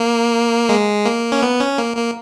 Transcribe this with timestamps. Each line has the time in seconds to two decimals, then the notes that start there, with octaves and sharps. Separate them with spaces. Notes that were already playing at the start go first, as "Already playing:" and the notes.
Already playing: A#3
0.69 G#3
1.05 A#3
1.32 C#4
1.43 B3
1.60 C#4
1.78 A#3
1.97 A#3